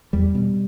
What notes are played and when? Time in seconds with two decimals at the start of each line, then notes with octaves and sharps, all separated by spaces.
0.13 E2 G3
0.35 B2